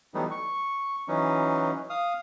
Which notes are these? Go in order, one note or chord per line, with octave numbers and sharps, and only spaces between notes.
E3 F#3 G3 A3 B3 D#4
C#6
E3 F#3 C#4 D#4
F5 D#6